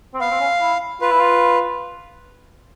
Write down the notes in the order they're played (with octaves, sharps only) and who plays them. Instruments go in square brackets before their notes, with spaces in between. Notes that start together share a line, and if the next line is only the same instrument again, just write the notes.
[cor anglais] C4
[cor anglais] B3 [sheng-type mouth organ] F5
[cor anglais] C4
C#4
E4
[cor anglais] F4 [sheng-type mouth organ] B4
[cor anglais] E4
F4